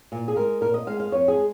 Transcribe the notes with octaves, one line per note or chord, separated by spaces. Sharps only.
A#2
G#4
G#3 A#4
A#2 A#4
D#5
G#3 F5
F5
F2 C#5
G#4
G#3